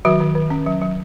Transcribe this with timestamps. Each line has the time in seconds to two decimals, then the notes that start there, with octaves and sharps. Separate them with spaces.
0.05 D#3 F#3 F#4
0.20 D#3
0.35 D#3
0.50 C#4
0.66 F#3
0.81 F#3